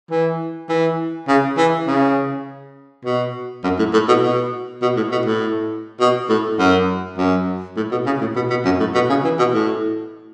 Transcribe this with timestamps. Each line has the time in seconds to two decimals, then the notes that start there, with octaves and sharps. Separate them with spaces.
0.10 E3
0.69 E3
1.28 C#3
1.57 E3
1.87 C#3
3.05 B2
3.64 F#2
3.79 A2
3.93 A2
4.08 B2
4.22 B2
4.82 B2
4.96 A2
5.12 B2
5.26 A2
6.00 B2
6.29 A2
6.59 F#2
7.17 F#2
7.77 A2
7.91 B2
8.06 C#3
8.21 A2
8.36 B2
8.50 B2
8.65 F#2
8.80 A2
8.94 B2
9.09 C#3
9.24 E3
9.39 B2
9.54 A2